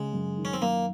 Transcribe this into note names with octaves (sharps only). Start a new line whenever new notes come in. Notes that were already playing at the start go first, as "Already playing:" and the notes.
Already playing: C#3 G#3
F#2
D#3
C#4
C4
F#2 A#3